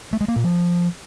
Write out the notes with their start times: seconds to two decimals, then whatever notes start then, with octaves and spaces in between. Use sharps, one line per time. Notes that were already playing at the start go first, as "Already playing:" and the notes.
0.13 A3
0.21 G#3
0.28 A#3
0.36 A#2
0.44 F3